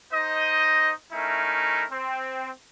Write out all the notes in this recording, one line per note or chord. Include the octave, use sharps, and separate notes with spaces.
D#4 C5 D#5
A3 C#4 D#4 E4 A#4
C4